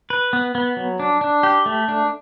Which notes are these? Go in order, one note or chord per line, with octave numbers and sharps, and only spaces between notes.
B4
B3
B3
F#3
D4
D4
G4
A3
D4